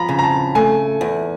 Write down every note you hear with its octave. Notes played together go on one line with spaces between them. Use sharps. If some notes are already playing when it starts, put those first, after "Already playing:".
Already playing: F3 A#5 B5
C#3
A#5
A5
A3 G#5
E2